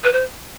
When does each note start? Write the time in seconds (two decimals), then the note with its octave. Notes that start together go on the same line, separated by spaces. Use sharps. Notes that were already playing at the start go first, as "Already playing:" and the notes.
0.04 B4
0.13 C5